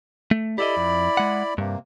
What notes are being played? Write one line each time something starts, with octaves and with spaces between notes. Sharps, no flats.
A3
E4 G4 A4 D5 D#5 B5
F2
G#3 F#5
G2 C3 A#3